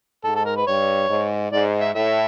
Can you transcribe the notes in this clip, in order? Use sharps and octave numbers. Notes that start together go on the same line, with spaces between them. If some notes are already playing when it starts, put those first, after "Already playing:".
G#2 A4
A4
A#4
B4
G2 C#5
G#2
G#2 D5
E5
A2 E5